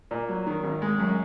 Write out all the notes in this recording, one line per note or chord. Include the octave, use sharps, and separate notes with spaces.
A#2
F#3
D#3
G#1
G#3
F#2